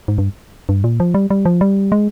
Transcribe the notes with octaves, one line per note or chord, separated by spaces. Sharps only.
G#2
G2
G2
A#2
F3
G3
G3
F3
G3
G#3